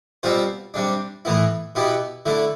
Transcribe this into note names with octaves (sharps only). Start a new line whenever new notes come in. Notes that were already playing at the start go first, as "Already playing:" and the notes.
B2 G3 C4 F4 C5
C3 G3 D4
A2 E3 B3 E4
B2 B3 E4 G4
D3 A3 E4